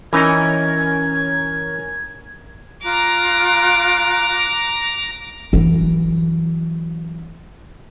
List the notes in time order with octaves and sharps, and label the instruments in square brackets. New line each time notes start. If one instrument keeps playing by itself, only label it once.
[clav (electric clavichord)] E3 D#4 D#5 [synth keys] C#4 A#4 [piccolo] G#6
[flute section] F4 F#6 [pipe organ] A#5 [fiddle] D6
[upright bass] F#2 E3